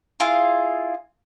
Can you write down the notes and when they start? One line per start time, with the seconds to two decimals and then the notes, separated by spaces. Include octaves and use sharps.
0.20 E4 F4 G#4 F5